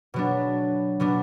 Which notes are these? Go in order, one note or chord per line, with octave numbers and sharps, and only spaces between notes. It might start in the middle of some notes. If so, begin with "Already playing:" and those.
B2 F#3 B3 D4
B2 F#3 B3 D4